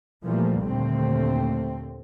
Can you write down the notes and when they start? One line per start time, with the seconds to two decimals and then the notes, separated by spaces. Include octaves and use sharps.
0.24 A#2 E3 F3 G3 A3 A#3
0.62 D#2 A#2 D3 A3 C4